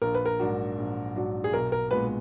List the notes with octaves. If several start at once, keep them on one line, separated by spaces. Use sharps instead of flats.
A#1 A#4
B4
A#4
G#2 F#3 D4 F#4
A#1
G#2 F#3 D4 F#4
G#4
B1 A#4
A#4
A#2 G#3 B3 B4